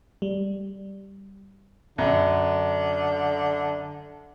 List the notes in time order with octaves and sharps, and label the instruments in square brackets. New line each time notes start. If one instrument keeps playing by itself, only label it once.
[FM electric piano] G3
[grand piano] F#2 [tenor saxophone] D3